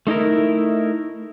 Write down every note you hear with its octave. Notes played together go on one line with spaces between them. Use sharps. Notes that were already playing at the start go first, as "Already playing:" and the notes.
A3 D#4 E4 A#4